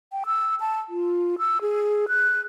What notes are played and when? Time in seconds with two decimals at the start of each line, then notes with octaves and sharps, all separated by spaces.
0.12 G5
0.26 E6
0.60 A5
0.89 F4
1.39 E6
1.61 G#4
2.08 F#6